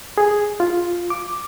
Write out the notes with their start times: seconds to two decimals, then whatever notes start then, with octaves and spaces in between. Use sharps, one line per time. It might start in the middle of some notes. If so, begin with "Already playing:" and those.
0.18 G#4
0.60 F4
1.10 D6